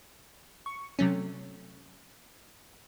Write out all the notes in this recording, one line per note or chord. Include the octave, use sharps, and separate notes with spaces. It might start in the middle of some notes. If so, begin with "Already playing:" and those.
C#6
C3 F#3 A3 C#4